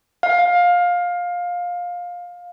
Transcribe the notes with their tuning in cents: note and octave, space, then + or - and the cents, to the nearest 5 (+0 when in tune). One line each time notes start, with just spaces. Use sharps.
F5 +20